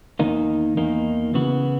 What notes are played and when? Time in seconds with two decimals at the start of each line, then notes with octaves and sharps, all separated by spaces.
0.19 E2 D#3 A#3 D#4
0.77 E2 D#3 A#3 D#4
1.34 C#3 E3 B3 F#4